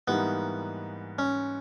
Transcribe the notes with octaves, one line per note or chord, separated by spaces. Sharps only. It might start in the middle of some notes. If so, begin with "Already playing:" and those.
G#2 E3 G3 A#3 B3 D#4
C#4